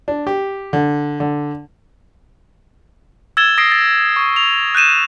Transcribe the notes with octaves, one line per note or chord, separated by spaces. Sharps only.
D4
G4
D3
D3
E6 G#6 A6 E7 G7
D#6 A#6 C7 D7
A6
C#6
F7
F#6 G6 D#7 E7